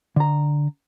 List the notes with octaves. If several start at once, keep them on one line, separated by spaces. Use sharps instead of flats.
D3 A#5